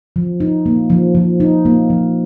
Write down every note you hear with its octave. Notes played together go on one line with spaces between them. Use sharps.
F3
D#4
A#3
F3
F3
D#4
A#3
F3